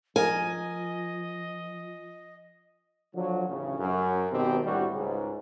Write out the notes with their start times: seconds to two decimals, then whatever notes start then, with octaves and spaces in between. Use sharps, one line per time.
0.16 F3 A#4 D#5 G#5
3.15 D3 F3 F#3
3.48 A1 D2 C#3
3.79 F#2
4.32 G#1 B2 D#3 C4 G4
4.65 D2 A2 G3 F#4
4.94 C#2 G#2